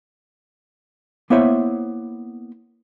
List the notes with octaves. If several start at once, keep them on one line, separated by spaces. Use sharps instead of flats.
A#3 B3 E4 C5 C#5 E5